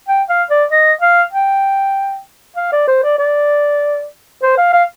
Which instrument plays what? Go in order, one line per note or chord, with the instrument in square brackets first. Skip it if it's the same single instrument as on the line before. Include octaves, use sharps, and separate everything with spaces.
[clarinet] G5
F5
D5
D#5
F5
G5
F5
D5
C5
D5
D5
C5
F5
F5